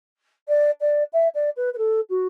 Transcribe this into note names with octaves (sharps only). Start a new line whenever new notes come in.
D5
D5
E5
D5
B4
B4
A4
F#4